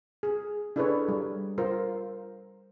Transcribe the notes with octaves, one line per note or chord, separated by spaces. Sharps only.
G#4
D4 E4 G#4 A4 B4 C#5
G3
F4 A#4 C5